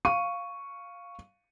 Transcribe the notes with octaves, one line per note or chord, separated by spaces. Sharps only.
F5 C#6 D#7